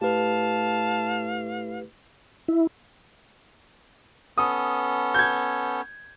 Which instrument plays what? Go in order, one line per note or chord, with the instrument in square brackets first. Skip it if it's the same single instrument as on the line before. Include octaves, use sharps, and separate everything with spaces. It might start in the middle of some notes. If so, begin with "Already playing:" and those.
[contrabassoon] A2 [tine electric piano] G4 B4 [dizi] F5 [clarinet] A5
[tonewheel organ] E4
[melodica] B3 C#4 A4 [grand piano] D#6
[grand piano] G6 G#6